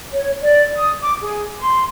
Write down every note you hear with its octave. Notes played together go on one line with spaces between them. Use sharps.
C#5
D5
D#6
D6
G#4
C6